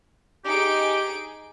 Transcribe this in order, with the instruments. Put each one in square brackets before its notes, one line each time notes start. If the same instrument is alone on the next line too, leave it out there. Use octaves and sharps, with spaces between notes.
[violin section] D#4 G#4 D7 [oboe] G4